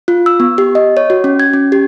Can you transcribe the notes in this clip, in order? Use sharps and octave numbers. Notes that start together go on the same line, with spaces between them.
F4
E6
B3
G4
D#5
C#5
F#4
C#4
G#6
C#4
G4